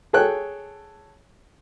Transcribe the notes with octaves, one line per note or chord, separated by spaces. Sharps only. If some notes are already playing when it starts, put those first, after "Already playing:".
G#4 A4 C#5 G5 F#6